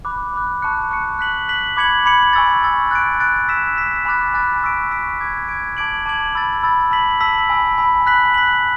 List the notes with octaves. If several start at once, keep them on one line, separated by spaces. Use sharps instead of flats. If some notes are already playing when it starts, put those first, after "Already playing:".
B5 D6 F#6
B5 D6 F#6
A5 C#6 F#6 C#7
A5 C#6 F#6 C#7
F#6 B6 F#7
F#6 B6 F#7
B5 D6 G#6 C#7 F#7
B5 D6 G#6 C#7 F#7
G#5 C#6 E6 A6
G#5 C#6 E6 A6
F#6 A6 D7
F#6 A6 D7
E6 B6 E7
E6 B6 E7
G#5 B5 D6 F#6 A6
G#5 B5 D6 F#6 A6
C#6 E6 B6 D7
C#6 E6 B6 D7
D6 G#6 D7
D6 G#6 D7
A5 D6 G#6 D7 F#7
A5 D6 G#6 D7 F#7
B5 E6 A6
B5 E6 A6
A5 E6 B6 F#7
A5 E6 B6 F#7
G#5 B5 E6
G#5 B5 E6
F#6 B6 F#7
F#6 B6 F#7